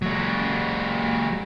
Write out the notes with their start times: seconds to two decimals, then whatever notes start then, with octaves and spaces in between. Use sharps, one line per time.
0.02 F#3 G#3